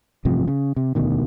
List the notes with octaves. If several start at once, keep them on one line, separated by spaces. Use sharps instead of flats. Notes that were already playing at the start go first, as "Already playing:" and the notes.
A1 G2 C3 F3
C#3
C3
E1 D2 B2 D#3